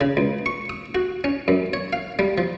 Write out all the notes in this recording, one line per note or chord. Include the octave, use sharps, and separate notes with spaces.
C#3
C#2
C#6
D#6
F#4
C#4
F#2
C#5
F5
G3
F3